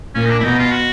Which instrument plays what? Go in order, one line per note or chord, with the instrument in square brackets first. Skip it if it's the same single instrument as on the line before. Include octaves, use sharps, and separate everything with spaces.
[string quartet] A#2 [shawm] C#4
[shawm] D#4
D4
E4
[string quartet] B2 [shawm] D#4
[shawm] F4
F#4